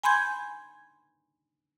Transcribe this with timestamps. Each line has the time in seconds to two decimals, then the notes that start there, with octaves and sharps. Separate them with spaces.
0.03 G#5 B5 C6 G6 G#6